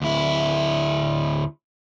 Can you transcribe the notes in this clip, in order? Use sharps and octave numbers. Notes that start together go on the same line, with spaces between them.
D2 E4